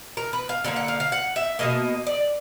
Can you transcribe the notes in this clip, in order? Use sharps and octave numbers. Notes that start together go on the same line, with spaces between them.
A#4
B4
F5
D3 F#3 A#3 F5
F#5
F5
F5
F#5
E5
B2 G3 A#3 D#5
D5